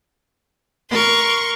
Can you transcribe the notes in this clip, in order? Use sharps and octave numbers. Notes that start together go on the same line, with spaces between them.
A#4 C6 C#6